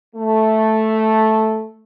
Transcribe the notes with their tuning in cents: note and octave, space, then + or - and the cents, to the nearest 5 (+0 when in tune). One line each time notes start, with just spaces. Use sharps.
A3 -5